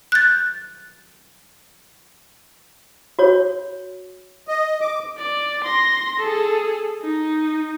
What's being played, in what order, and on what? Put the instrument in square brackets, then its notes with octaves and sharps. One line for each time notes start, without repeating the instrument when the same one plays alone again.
[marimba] F#6 G6 A6
[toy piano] F#4 C#5
[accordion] D#5
D6
[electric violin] D5
C6 A#6
G#4 A4
D#4